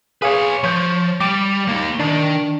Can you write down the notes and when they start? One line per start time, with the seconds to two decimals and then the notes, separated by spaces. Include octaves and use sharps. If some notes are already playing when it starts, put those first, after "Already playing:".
0.22 G#4 B4 C#5 F5 G#5
0.64 F3 C#5 G6
1.21 G3 D6
1.69 A#3 D#4
2.00 D#3 D4